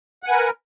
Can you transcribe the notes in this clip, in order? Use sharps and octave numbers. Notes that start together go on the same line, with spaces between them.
A#4 B4 F#5 G#5